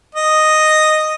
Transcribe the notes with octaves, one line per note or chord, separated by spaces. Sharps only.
D#5